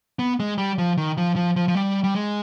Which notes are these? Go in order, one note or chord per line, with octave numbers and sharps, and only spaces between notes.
B3
G#3
G3
F3
D#3
F3
F3
F3
F3
G3
G3
G#3